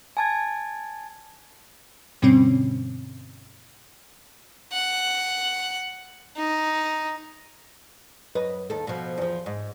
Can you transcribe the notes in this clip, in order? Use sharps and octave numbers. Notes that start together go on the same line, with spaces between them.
G#5 A5 G#6
G2 B2 D3 G3 C4 C#4
F#5
D#4
F#2 B4 D#5
D#2 A4
B2 F3
E2 F3
G#2